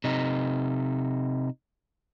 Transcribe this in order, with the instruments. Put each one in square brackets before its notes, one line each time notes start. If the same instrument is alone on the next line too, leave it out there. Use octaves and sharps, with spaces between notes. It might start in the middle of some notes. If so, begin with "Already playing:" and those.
[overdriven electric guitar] C3 D#4